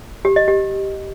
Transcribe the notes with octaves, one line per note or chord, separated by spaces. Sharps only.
G4
D#5
G4